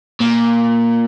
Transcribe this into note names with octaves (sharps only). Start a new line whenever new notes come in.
A#2